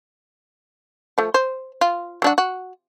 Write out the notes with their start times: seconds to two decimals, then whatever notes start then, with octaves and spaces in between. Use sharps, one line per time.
1.18 F3 A3
1.34 C5
1.81 F4
2.22 F#3 D4 F#4
2.38 F#4